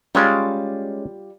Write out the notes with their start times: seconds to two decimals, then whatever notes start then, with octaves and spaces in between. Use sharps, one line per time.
0.15 G3 G#3 C#4 F4 D5